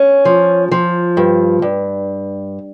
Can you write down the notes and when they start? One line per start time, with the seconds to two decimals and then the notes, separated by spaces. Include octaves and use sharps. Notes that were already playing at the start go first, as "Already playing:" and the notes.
Already playing: C#4
0.25 F3
0.72 F3
1.17 G2
1.62 G2